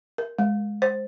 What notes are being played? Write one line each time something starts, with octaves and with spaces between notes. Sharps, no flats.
A#4
G#3
C5